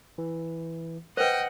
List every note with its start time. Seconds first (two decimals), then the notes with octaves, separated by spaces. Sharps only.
0.18 E3
1.17 B4 C5 D#5 F#5 G5